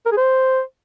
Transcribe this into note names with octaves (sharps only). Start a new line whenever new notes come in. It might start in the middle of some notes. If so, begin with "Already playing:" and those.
A#4
G#4
C5